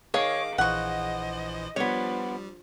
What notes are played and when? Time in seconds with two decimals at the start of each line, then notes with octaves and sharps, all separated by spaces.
0.14 D#3 G#4 C#5 F5 D6
0.58 A#1 E3 C5 D#5 F#5 C#6
1.76 F3 G3 B3 D4 C#5